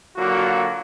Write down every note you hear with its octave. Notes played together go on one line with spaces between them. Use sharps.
D3 F#3 A#3 F4 F#4